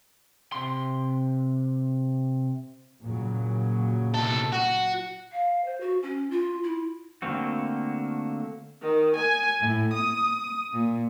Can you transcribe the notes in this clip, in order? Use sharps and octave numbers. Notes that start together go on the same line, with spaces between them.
C3 C6
A#2 C#3 F#3
C2 A4
F#4
F5
C5
F#4
C#4
F4
E4
D3 A3 A#3 C4 F#4
D#3
G#5
A2
D#6
A#2